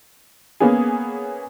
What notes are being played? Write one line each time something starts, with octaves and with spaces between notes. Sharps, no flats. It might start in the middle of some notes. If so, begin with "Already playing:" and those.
A#3 B3 C#4 G#4